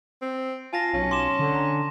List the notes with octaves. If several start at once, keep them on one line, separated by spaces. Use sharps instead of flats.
C4
F4 G#5 A5 A#6
B1 C#4
C6 D6 E7
D3
A#5